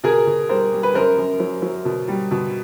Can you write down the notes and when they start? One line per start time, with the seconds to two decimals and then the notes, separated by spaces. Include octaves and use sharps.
0.03 B2 G#4 A#4
0.27 B2
0.49 G3 A#4 C5
0.72 G3
0.83 B4
0.94 F#2 A#4 C5
1.17 F#2
1.40 F#3
1.62 F#3
1.85 B2
2.08 G3
2.31 B2